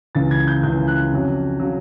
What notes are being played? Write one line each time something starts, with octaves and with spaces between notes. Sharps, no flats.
C#2 C#3 E3 A6
G#6
G6
C#2 C#3 E3 G6
F#6
F2 C#3 F#3
C#3 F#3